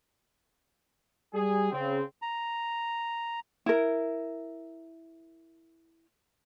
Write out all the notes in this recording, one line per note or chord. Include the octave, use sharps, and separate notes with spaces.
G3 G#4
C#3 C4
A#5
E4 A#4